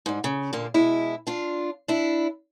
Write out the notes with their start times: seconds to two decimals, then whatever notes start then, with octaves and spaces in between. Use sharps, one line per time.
0.06 G#2 G3
0.24 C#3
0.53 A#2 D3 A#3
0.74 B2 G#3 E4
1.27 D4 F4
1.88 D4 E4